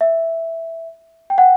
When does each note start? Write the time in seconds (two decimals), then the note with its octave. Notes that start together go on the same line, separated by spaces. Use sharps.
0.01 E5
1.30 G5
1.38 F#5